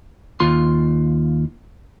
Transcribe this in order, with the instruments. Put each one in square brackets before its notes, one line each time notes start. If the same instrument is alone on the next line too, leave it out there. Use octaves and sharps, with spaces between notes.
[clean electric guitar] D#2 F4 C6